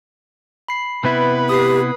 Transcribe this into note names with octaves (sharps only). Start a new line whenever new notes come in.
B5 C7
C3 B3 E4 B4
G4 D#6 C7